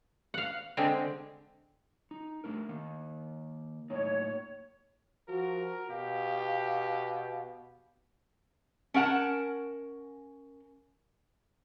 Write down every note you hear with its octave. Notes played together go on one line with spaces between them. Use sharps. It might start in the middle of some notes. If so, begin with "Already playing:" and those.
F5 F#5
D3 G#3 C4
D#4
A3 D4 A#4
D#3 A#3
A2 A#3 D#4 C#5
F3 F#4 A#4
B2 G4 F5
C#4 A#4 F#5 A5